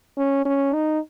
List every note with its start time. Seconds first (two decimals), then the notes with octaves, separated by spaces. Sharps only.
0.17 C#4
0.45 C#4
0.73 D#4